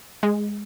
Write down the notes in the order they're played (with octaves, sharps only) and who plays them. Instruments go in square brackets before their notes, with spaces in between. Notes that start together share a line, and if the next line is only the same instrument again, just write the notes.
[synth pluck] G#3